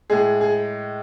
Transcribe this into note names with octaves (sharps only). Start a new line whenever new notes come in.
A2 G#3 G#4
G#4